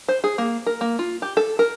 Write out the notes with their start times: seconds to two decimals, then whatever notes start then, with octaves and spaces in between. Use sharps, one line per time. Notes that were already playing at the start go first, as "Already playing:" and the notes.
0.08 C5
0.24 G#4
0.38 A#3
0.66 A#4
0.81 A#3
0.99 F4
1.22 G4
1.37 A4
1.59 A#4